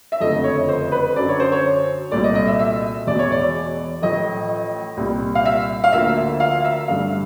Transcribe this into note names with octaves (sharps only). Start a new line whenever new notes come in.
E5
F#1 F2 D3 F3 A3 D#5
C#5
C5
B4
F#2 D3 F#3 D5
C#5
C5
C#5
C2 A#2 F#3 A3 D5
D#5
D#5
E5
E5
E1 E2 B2 D5
C#5
D5
A1 A2 F3 D#5
C2 A#2 G3
F5
E5
F5
D2 D3 F3 A#3 E5
E5
F5
E5
A1 G2 D3 F5